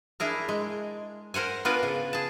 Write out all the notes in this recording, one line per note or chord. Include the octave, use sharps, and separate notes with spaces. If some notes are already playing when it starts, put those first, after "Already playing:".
D4 E4 G#4 A#4
G#3
A#4 C5 F#5 G#5
B3 D4 F4 A#4 B4 G#5
C#3
G#4 A5